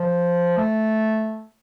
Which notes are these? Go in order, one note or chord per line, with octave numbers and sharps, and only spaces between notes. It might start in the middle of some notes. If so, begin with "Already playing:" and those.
Already playing: F3
A3